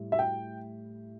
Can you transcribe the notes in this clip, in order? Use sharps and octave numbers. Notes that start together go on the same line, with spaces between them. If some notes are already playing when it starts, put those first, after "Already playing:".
Already playing: A2 G3
E5
G5